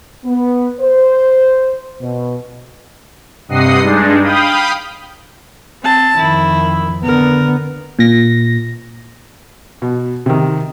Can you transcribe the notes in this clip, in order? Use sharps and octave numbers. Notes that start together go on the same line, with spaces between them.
B3
C5
B2
G2 C3 D#5 F#5 D#6 C7
G2 G#3 D4 D#4
F5 G5 B5 D#6
C4 A5
F2 D#3 E4
D3 B3 A#4
A#2 A#6
B2
C3 D#3